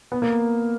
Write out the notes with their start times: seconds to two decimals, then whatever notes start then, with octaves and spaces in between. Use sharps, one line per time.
0.12 B3
0.22 A#3